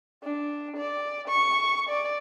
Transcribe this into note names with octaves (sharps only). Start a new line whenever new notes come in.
D4
D5
C#6
D5